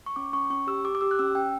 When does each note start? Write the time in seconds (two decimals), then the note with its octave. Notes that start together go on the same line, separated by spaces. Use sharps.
0.06 C#6
0.16 C#4 D6
0.33 C#4 C#6
0.50 C#4 C#6
0.67 G4 E6
0.85 G4 D6
0.95 D6
1.01 G4 E6
1.11 F#6
1.19 C#4 E6
1.35 C#4 G5